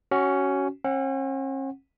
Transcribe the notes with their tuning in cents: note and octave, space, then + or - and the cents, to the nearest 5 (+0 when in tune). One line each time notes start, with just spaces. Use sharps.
C#4 +0 F#4 +20
C#4 -45 F#5 +0